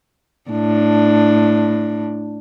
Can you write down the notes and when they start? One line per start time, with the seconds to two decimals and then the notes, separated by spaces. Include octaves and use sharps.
0.50 A2 D4